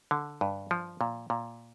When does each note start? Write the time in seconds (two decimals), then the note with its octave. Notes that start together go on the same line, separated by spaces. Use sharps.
0.11 D3
0.41 G2
0.71 F3
1.01 A#2
1.30 A#2